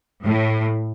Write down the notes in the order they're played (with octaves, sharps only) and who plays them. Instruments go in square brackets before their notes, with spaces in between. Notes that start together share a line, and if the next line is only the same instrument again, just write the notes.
[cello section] A2